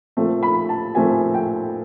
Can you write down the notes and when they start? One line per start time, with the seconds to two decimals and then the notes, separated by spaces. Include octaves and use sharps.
0.17 A#2 F3 A3 C4
0.43 B5
0.69 A5
0.95 A#2 F3 A3 C4 G#5
1.34 G5